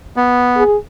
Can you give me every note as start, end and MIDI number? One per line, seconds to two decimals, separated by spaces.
0.16 0.64 59
0.57 0.76 68